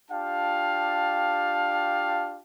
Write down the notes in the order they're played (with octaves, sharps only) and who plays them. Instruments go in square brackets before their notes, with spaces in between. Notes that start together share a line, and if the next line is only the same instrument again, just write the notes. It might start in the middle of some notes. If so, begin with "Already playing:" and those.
[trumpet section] D4 F4 G4 F5 G5 A5